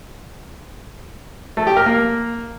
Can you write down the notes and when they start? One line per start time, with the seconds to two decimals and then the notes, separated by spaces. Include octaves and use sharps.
1.57 A3
1.67 G4
1.77 A#4
1.86 A#3